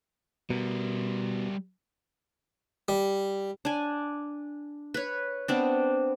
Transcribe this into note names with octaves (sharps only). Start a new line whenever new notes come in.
B2 G3 A#4
G3
D4 G#5
B4 C#5
B3 C4 D4